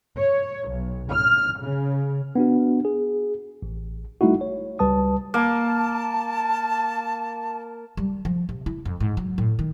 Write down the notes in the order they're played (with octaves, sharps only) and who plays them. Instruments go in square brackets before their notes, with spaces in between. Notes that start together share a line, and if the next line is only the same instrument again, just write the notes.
[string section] C#5
B1
F6
C#3
[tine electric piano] B3 D4 F#4
G#4
A1
G3 A3 D#4 E4 F#4
C#5
C#2 G3 B4 A5 D#6
[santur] A#3 [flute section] A5
[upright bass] G3
F3
C3
E4
F2
G#2
F#3
A2
D#3